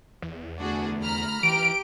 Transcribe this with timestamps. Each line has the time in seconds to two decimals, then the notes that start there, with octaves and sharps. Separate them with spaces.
0.22 E2
0.59 D2 D4 F#4 G#4
1.02 A#5 B5 F6
1.43 E3 G4 D7